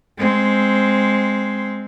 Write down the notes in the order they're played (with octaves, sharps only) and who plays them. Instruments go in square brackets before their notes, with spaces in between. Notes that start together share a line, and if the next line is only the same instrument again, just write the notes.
[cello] G#3 C4